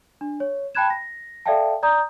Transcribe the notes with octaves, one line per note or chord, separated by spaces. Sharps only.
D4
C#5
G5 A5 B5 F#6 G#6 E7
A#6
A4 D5 E5 F5 G5 A5
D5 A#5 D#6 G6